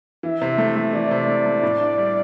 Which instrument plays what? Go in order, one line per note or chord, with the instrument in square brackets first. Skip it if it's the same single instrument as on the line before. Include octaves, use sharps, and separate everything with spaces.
[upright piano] E3 [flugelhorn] E5
[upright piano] C3
A3
A3
[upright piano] E3 [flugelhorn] D5
[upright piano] C3
A3
A3
A2
D4
G3